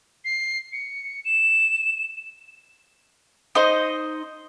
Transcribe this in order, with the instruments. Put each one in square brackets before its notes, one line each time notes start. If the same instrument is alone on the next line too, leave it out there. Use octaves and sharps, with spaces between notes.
[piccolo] C7
C#7
E7
[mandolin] D#4 C5 D#5